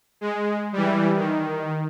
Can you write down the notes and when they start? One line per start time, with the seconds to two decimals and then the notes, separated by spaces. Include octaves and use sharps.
0.21 G#3
0.73 E3 G3
1.16 D#3